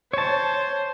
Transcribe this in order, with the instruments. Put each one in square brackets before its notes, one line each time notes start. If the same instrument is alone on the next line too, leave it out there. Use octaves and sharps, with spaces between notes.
[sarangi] C5 [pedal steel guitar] C#5 A5